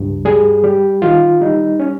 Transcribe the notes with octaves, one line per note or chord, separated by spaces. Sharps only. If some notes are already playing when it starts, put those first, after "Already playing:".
Already playing: C#2 G2
G3 G#4
G3 G4
D#3 F4
G3 D#4
C#4